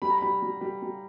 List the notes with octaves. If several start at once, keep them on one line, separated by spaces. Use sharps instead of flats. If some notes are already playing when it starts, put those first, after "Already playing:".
G3 B5
A#5
G3 B5
G3
G3
G3